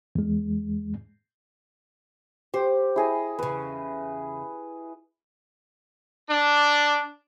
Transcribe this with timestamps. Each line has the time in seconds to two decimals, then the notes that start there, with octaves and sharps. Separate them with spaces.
0.15 E2 G#3
2.54 G4 C5
2.96 E4 G#4 D#5
3.39 E2 C#3 B4
6.29 D4